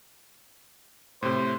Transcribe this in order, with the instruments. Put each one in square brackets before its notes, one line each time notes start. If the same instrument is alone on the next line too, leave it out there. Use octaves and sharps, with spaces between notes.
[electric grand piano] A2 C3 [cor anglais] C5